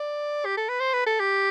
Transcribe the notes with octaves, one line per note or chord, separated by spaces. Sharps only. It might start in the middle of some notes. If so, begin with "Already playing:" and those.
Already playing: D5
G4
A4
B4
C5
B4
A4
G4